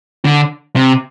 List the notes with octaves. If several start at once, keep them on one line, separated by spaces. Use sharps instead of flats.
D3
C3